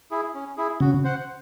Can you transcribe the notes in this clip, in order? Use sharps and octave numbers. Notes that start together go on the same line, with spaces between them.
E4 G#4
C#4
E4 G#4
C#3 F#4
C5 F#5